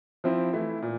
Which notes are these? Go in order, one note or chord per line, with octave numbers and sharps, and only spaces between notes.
F3 C4 E4
E3 A3 E4
A#2